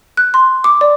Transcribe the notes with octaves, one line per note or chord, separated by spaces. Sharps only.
F#6
C6
D6
D5